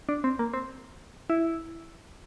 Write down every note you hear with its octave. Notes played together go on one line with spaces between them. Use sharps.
D4
C4
A#3
C4
E4